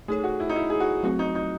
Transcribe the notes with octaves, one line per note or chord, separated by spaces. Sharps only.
A3 D#4 G#4 A4 C#5
F#4
E4
D#4
E4
G#4
F#4
F#3 A3 C4 F#4
D#4
D#4